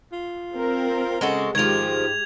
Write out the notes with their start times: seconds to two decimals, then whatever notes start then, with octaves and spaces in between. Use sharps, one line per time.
0.12 F4
0.54 C4 A#4
1.21 C#3 G#3 F#4 A4
1.55 G#2 D#3 F3 G#3 G4 G#6 F7